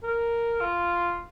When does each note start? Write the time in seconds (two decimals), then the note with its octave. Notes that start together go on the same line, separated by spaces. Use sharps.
0.03 A#4
0.61 F4